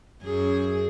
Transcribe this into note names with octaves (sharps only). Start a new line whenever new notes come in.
F#2 G#4